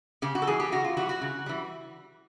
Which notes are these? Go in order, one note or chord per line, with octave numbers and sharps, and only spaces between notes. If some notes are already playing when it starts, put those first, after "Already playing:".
C#3 G4
F#4
A4
E3 G3 G#4
G4
C#3 F#4
F4
E3 G3 F#4
F#4
C#3
E3 G3